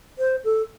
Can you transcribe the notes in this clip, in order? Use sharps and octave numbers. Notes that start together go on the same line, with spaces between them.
C5
A4